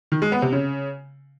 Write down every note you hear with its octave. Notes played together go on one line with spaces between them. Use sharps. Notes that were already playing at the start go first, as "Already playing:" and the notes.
D#3
G#3
B3
C3
C#3